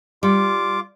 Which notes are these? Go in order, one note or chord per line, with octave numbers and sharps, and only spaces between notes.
G3 F4 D6